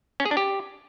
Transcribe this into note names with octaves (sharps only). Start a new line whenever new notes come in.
C#4
G#4
D4
G4